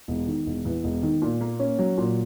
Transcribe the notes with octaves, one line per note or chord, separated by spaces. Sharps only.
E1
D#3
E1
E2
E1
D#3
A#2
A#3
C#4
F#3
A#2